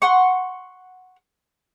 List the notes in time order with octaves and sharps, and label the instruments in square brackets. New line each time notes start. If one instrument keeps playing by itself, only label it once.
[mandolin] F#5 C6 C#6